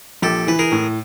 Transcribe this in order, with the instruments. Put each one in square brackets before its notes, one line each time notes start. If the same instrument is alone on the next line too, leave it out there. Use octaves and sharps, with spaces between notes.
[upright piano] A#1 [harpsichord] G4 A4
[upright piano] E3 [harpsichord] B4
[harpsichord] G#4 A#4
[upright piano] A2